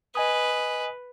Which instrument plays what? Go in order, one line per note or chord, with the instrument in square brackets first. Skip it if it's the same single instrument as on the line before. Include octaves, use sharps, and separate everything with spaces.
[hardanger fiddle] B4 [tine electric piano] D#5 G#5 D#6